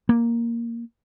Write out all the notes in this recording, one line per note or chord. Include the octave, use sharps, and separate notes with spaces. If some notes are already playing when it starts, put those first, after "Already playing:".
A#3